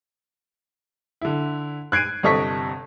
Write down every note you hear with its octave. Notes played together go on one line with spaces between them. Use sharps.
D3 E4
F#6 G#6 C7 D7 D#7
G1 C3 A4 D#5 C#6 B6